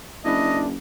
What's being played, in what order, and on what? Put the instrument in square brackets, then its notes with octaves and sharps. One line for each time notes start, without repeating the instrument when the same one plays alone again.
[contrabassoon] F#1 [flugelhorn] D4 [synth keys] E4 B4 [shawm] D#5